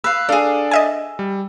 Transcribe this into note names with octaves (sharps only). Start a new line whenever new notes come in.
B4 F5 E6
D4 G#4 A4 D5 F5
D#5 E5 G#5
G3